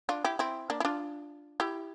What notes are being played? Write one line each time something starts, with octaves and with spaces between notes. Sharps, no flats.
D4 F4
E4 G4
C4 E4
A#3 D4
E4
D4 F4
E4 G4